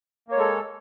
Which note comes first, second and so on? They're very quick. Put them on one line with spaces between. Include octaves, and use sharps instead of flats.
A#3 C#5 G#3 A4